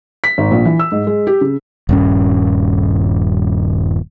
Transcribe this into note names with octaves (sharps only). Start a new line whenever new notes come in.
B6
G#1
A#1
E3
E6
G#2
G#3
G4
C#3
D#1 G2 C#4